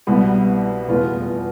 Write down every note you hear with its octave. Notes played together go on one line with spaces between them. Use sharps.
C2 B2 G3 B3
F1 E2 B2 B3 F4